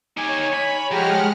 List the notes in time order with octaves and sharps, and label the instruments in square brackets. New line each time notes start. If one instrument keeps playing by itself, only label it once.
[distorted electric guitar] D#4 G4 [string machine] C#5 [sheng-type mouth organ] G#5
[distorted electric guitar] B5
[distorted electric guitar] F3 [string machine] G#3 F#5 F6 [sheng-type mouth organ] G4 G#4 A#5